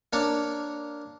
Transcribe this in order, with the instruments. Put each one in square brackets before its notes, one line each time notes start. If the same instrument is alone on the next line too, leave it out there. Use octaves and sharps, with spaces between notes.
[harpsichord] A#3 D4 C#5